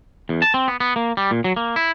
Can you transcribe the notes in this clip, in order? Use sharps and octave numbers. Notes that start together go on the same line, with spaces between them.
E2
A5
C4
B3
B3
A#3
G3
A#2
F#3
A#3
E4